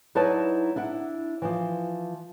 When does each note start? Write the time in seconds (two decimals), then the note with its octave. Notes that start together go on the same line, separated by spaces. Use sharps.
0.15 F#3 D#4 E4 B4 D5 A5
0.76 D4 E4 F#5
1.42 E3 F3